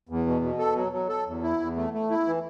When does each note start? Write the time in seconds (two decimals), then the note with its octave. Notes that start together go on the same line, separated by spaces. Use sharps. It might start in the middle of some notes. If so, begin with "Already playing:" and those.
0.09 E2
0.26 B2
0.42 B2
0.59 A4
0.76 F#3
0.92 F#3
1.09 A4
1.27 E2
1.43 E4
1.60 E2
1.76 A3
1.93 A3
2.10 E4
2.27 E3